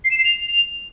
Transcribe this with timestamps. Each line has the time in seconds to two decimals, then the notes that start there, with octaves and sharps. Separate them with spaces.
0.05 C7
0.11 E7
0.18 C7
0.25 F7